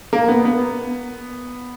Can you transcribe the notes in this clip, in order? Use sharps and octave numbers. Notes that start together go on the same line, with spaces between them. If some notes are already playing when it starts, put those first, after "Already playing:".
A#3
B3
B3